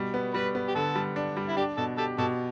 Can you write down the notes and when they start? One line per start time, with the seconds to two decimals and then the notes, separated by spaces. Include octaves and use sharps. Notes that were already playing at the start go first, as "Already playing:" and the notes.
Already playing: B2 G3
0.14 B3
0.34 G3 B4
0.55 B3
0.68 G4
0.75 D3 A4
0.95 G3
1.16 D4
1.37 G3
1.49 E4
1.57 D4 G4
1.77 B2 A4
1.98 G4 A4
2.18 B2 A4